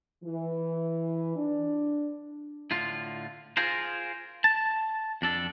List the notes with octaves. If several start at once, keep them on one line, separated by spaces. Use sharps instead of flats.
E3
D4
A2 D3 F4
F4 G#4 A#4 C5
A5
F2 D4 A4